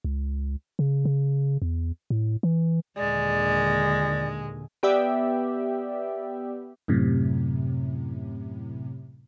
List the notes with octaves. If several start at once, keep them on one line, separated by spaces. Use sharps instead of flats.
C#2
C#3
C#3
E2
A2
E3
D#2 A#2 D3 G#3 D5
B3 G4 D5 E5
F#2 A2 C3